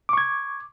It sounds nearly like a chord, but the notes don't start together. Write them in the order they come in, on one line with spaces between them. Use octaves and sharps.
D6 C#6 G#6